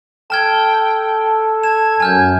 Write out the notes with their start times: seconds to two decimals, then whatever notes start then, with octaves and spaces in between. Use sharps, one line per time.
0.30 A4 G5 A5 F6 G#6
1.63 G#6 E7
2.00 F#2 G#5 F6 G6